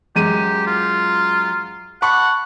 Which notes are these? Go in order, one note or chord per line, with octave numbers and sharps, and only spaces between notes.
F#2 G#3 G4 D#7
F4
F#5 A5 B5 C#6